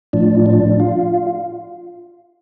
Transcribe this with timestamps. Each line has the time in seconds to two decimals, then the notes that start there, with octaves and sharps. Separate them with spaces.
0.13 A2 F3 D4
0.46 D4
0.80 F4